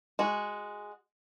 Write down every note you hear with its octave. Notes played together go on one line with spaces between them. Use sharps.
G#3 F#4